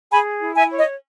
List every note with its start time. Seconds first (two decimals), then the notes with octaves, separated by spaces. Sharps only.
0.11 G#4 G#5 B5
0.41 E4
0.55 E5 G#5
0.70 C#5
0.77 D#5